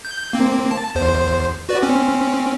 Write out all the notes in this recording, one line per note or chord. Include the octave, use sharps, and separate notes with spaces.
G6
A#3 C4
A5
E2 C5
F#4 B4 D5
C4 C#4